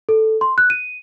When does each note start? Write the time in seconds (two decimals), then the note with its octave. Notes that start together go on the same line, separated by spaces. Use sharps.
0.09 A4
0.41 C6
0.58 F#6
0.70 D#7